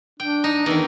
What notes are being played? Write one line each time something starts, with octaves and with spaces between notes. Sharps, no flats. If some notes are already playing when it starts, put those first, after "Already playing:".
D4 G5
D#4
E2 D#3 D#4